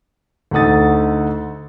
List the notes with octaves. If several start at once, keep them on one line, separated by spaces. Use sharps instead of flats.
D2 A3 D#4 F#5 D#6 A6